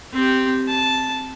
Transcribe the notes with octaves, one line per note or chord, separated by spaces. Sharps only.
C4 G4
A5